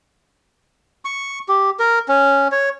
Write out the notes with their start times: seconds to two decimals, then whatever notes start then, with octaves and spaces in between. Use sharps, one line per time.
1.05 C#6
1.48 G4
1.80 A#4
2.08 C#4
2.52 C#5